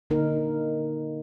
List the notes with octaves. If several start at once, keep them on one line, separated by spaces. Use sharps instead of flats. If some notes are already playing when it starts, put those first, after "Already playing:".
D3 A#3 D#4 A#4